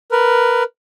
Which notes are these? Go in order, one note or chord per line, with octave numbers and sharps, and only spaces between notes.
A#4 B4